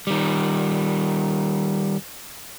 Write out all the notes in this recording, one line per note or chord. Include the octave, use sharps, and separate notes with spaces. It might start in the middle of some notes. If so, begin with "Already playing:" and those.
D#3 G3